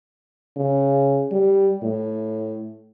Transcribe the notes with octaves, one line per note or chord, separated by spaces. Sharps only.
C#3
G3
A2